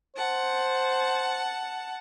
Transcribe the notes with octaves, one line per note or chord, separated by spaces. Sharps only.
C5 F#5 A5